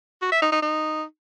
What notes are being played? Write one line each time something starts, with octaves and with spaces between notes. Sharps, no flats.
F#4
E5
D#4
D#4
D#4